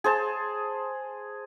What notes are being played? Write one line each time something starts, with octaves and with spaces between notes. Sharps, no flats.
G#4 C5 A5